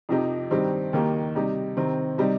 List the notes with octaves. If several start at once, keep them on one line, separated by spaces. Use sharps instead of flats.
F2 C3 F3 D#4 G4
G2 D#3 C4 D#4 G4
D#2 D#3 A#3 G4
C3 G3 D#4 G4
C3 D#3 C4
C3 G3 D#4 G4